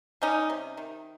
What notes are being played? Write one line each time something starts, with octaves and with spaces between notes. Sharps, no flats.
G3 C#4 D#4
C3
D#3